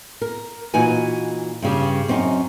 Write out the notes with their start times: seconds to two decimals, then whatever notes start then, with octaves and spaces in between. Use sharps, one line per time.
0.21 A#4
0.74 A#2 E3 D#4 F#4 G#5
1.62 G2 C#3 G4
2.08 F#2 C4 C#4 D#4